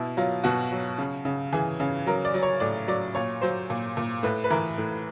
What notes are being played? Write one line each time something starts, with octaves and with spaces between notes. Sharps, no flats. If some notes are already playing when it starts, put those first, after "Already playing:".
Already playing: B2 E4
F#3 F4
B2 F#4
F#3
C#3
C#3
E3 G#4
C#3
F#3 A#4
D5
F#3
C#5
A2 D5
F#3 D5
A#2 C#5
F#3 C5
A#2
A#2
A2 B4
B4
E3 A#4
A2